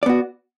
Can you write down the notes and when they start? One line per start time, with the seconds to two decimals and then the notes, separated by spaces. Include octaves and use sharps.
0.03 D5
0.06 B3
0.09 F#4